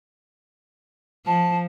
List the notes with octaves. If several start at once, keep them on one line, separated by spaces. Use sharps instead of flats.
F3 A5